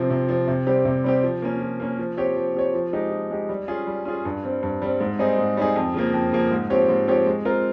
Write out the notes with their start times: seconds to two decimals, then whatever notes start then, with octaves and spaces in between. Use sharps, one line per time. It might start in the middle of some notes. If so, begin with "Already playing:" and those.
Already playing: C3 F3 C4
0.10 C3
0.28 F3 C4
0.48 C3
0.67 G3 C4 G4
0.85 C3
1.04 G3 C4 G4
1.23 F3
1.42 A#3 C#4
1.61 F3
1.80 A#3 C#4
1.99 F3
2.17 C4 G4 C#5
2.36 F3
2.55 C4 G4 C#5
2.74 F3
2.93 G#3 D#4 G4
3.12 F3
3.31 G#3 D#4 G4
3.49 G3
3.68 C#4 F4 G#4
3.87 G3
4.05 C#4 F4 G#4
4.25 G2
4.44 G3 C4
4.63 G2
4.82 G3 C4
5.00 G#2
5.19 G3 C4 D#4 G#4
5.38 G#2
5.57 G3 C4 D#4 G#4
5.76 F2
5.94 C#3 F3 A#3
6.14 F2
6.32 C#3 F3 A#3
6.51 G#2
6.70 F3 C4 G4 C#5
6.89 G#2
7.07 F3 C4 G4 C#5
7.26 G#3
7.45 C4 F4 A#4